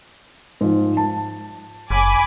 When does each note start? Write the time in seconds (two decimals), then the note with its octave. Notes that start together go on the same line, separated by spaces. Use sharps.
0.61 G#2 F3
0.97 A5
1.91 F#1 G#5 B5 D6